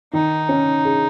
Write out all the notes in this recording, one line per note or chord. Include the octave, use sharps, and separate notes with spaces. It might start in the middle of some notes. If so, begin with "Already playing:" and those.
D#3 D#4
C#4
G#4